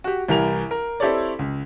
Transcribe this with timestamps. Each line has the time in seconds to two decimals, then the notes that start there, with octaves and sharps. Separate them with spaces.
0.04 F#4 G4
0.28 C2 E3 G4 A#4 F7
0.71 A#4
1.00 C4 E4 G4 A4 C#5 D5
1.39 C#2